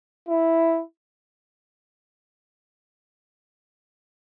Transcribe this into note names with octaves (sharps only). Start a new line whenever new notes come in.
E4